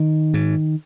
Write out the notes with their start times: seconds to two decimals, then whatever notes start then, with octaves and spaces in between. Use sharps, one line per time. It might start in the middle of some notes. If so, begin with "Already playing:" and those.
Already playing: D#3
0.34 G#2